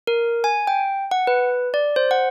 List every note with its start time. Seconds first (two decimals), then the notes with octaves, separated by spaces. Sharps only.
0.07 A#4
0.44 G#5
0.67 G5
1.11 F#5
1.27 B4
1.74 D5
1.96 C5
2.11 F#5